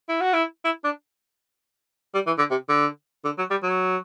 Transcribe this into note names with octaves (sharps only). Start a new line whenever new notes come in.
E4
F#4
E4
E4
D4
G3
E3
D3
C3
D3
D3
F#3
G3
F#3